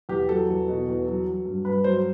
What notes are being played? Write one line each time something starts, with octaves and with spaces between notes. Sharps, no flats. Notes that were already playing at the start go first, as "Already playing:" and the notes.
E2 G4
F#3 A4
E2
B2
E2
F#3
F#3
G2
G2 B4
F#3 C5